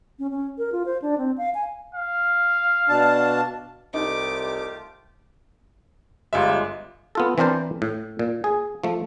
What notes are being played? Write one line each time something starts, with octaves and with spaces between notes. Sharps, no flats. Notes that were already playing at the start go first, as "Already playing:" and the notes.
C#4
C#4
A#4
F4
C5
D4
C4
F5
G#5
F5
B2 D4 A5
C2 A3 D#4 F4 G4 D6
G1 G3 G#3 F4 D5 E5
B3 F4 A4
E3 C4 D4 A#4 C5 A5
A2
A#2
G#4
F3 A3